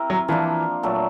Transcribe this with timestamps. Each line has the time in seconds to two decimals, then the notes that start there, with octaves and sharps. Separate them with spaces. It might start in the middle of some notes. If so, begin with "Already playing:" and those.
Already playing: C4 E4 G4 A#4
0.10 F#3
0.28 E3 F3 A#3 D4 F4
0.83 A#2 F#3 A3